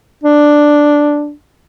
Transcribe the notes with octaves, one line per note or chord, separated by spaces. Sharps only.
D4